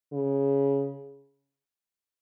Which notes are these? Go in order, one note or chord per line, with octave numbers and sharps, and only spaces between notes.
C#3